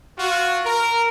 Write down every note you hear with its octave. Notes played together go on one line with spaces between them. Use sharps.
F4 F#4
A#4